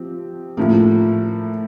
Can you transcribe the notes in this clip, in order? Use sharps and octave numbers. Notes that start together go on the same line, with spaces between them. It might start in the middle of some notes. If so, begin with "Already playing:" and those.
Already playing: F3 C4 G4
A2 F3 A#3